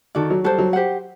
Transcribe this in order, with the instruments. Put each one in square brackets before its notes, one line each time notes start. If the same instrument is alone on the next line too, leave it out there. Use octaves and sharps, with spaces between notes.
[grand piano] D#3 [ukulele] F#4 A4 D5
[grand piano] F#3
[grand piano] G3 [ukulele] F#4 A4 C5
[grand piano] F#3
[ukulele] G4 C5 F#5